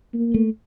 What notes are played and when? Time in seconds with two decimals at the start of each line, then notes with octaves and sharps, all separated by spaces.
0.14 A#3
0.34 A3